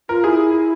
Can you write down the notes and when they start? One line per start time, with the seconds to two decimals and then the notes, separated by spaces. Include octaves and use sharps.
0.09 F4 A#4
0.24 E4 G#4